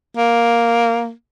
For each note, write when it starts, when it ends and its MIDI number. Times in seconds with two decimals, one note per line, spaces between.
0.17 1.11 58